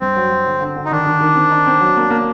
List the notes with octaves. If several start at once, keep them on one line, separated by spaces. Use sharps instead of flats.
G2 C4
F#3
F#3
D3
D3
D3
D#4
D#3 D4
D#3
D#3
C4
D#4
C4
F#3
A#3
A#3